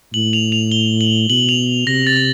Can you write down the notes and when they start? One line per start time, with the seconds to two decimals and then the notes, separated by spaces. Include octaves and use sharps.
0.14 A2 F#7
0.33 F7
0.52 F7
0.72 G7
1.01 F#7
1.30 B2 F#7
1.49 F7
1.87 C3 A#6
2.07 A6